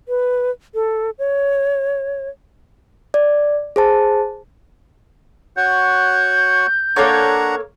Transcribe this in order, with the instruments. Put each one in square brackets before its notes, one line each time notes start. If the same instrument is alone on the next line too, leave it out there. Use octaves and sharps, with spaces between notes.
[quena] B4
A4
C#5
[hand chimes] D5
G#4 C5 A5
[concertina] F#4 C#5 F#5 [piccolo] G6
[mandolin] A#3 A4 C#5 [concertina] D4 F#5 A#5